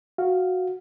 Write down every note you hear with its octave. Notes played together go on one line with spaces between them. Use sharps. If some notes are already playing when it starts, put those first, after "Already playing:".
F#4 F5